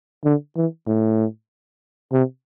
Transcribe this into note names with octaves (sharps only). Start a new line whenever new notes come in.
D3
E3
A2
C3